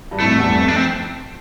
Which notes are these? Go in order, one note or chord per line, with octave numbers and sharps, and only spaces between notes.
G2
F2 A2 A3
E2 G2
F2
F2 D4
C4